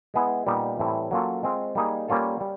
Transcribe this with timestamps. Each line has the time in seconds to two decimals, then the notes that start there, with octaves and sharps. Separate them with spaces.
0.14 G#3 B3 E4 G#4
0.47 A#2 G3 B3 D#4 G4
0.79 A2 E3 G3 C4 E4
1.11 F#3 A#3 C#4 F4 A4
1.43 G#3 C4 F4
1.75 G3 A#3 D#4 G#4
2.08 G3 A#3 C#4 F4 A4
2.41 G3